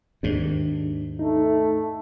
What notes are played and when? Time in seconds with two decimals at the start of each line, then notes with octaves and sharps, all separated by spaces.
0.23 D#2 G#2 D4
1.19 A3 D#4